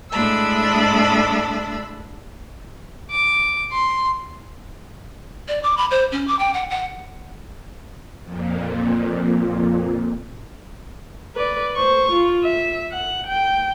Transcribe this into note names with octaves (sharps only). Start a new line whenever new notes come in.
A2 G#3 D4 A5 B5 E6
D6
C6
D5
D6
B5
C5
C#4
D6
G5
F#5
F#5
F2 A#2
B4 D5
C5 C#6
F4
E5
F#5
G5